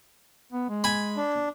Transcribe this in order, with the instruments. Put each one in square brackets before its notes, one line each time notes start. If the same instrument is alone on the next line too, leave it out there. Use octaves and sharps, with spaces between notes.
[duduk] B3
G#3
[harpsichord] G#5 B5
[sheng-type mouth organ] D4